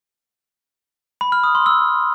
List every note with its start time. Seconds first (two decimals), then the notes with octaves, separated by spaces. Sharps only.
1.21 B5
1.32 F6
1.44 D#6
1.55 C6
1.66 E6